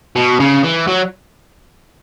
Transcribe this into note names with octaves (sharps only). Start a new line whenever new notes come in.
B2
C#3
E3
F#3